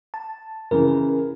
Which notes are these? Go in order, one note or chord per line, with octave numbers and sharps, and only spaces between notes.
A5
C#3 E3 A#4